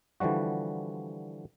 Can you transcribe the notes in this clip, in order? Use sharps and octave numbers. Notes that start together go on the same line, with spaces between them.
D3 E3 F3 G3 F#4